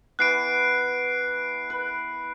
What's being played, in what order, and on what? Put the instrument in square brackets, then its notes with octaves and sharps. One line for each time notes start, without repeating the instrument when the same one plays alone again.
[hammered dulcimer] E3 B3 [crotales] F#6 C7 D7
[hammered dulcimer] B4